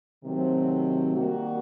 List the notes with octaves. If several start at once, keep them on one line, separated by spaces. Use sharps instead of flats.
C3 D#3 F#3 A3 C4
D#3 G3 A#3 F#4